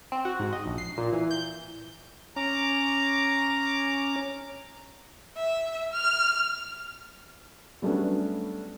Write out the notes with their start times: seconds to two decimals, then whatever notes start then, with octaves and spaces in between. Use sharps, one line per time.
0.12 C4
0.25 F#4
0.39 G#2
0.52 D#5
0.66 A#1
0.78 C7
0.98 A#2
1.13 E3
1.31 G6
2.36 C#4 A#5 D6
5.36 E5
5.93 F6
7.82 F#3 G3 A3 B3 C#4 D4